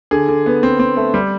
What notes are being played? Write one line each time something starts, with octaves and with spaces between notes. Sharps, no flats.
D3 G#4
D3
B3
C4
C4
A3
G3